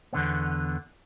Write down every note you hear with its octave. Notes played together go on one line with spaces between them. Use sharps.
E2 D3 B3